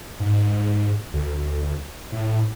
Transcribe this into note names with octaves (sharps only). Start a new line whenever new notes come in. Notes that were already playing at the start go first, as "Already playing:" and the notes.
G#2
D2
A2